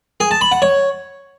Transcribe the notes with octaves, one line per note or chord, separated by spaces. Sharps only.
G#4
A5
B5
F#5
C#5